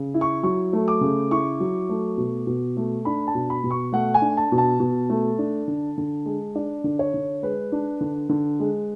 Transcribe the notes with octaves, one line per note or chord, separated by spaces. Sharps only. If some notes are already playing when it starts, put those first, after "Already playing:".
Already playing: C#3
E4
C#6
F#3 C#6
A3
D6
C#3
E4 C#6
F#3
A3
B2
B2
A3
D4 B5
A5
B2
B5
B2
C#6
A3 F#5
G#5
D4
A5
B2
A5
B2
A3
D4
D3
D3
G#3
D4 D5
D3
C#5
D3
G#3 B4
D4
D3
D3
G#3